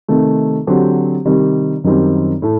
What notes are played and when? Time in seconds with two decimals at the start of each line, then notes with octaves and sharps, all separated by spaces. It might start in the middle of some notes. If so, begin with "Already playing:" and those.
0.08 C3 D#3 A3
0.67 D3 F#3 C4 G4 C5
1.25 C3 D#3 G3
1.84 F#2 D#3 G3 C4
2.42 A2 A3